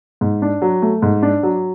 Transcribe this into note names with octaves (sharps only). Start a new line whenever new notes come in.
G#2
D4
F#3
A3
G#2
D4
F#3